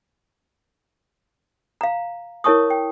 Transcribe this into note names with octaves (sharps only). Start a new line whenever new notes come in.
F5 A#5
E4 A#4 C#5 A5 C#6 D#6
G5